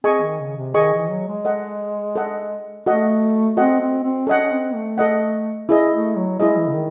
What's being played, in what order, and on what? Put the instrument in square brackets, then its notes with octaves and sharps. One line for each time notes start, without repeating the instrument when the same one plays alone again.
[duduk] C4 [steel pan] G#4 D#5 G#5 C#6
[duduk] D#3
C#3
C3
[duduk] D#3 [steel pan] G#4 D#5 G#5 C#6
[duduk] E3
F#3
G#3
[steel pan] A4 D#5 F#5
A4 D#5 F#5
[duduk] A3 [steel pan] F#4 A4 D#5 F#5
[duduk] C4 [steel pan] F#4 A4 D#5 F#5
[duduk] C4
C4
[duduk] C#4 [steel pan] A4 D#5 F#5
[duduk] C#4
C4
A3
[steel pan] A4 D#5 F#5
E4 G#4 D#5
[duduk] A3
F#3
[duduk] G#3 [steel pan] E4 G#4 D#5
[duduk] E3
C#3
D#3